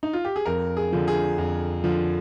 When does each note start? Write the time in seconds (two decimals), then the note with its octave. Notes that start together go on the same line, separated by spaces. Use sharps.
0.03 D#4
0.13 F4
0.25 G4
0.36 G#4
0.46 F2 A#4
0.77 G#4
0.92 D3 F3
1.08 G#4
1.38 F2
1.84 D3 F3